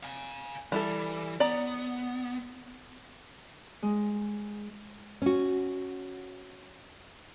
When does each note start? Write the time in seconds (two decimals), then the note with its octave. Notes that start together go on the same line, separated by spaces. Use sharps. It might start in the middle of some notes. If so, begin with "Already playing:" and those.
0.03 F5 G#5
0.72 E3 G3 E4 A4
1.40 B3 D5 A#5
3.83 G#3
5.22 C#4 F#4